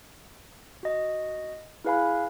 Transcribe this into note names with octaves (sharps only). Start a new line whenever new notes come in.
F#4 D#5
E4 G#4 B4 F5 G#5 B5